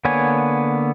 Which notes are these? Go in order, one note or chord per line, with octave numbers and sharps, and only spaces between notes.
D3 A#3 B3 C#5 G#5